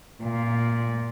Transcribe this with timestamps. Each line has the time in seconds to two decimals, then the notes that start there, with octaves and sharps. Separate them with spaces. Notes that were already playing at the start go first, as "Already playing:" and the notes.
0.23 A#2